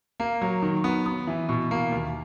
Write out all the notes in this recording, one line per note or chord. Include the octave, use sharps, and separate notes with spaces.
A#3
F#3
D#3
B3
B3
E3
B2
A#3
D#2